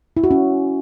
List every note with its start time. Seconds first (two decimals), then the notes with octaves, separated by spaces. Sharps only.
0.17 E4
0.24 F#4
0.31 C#4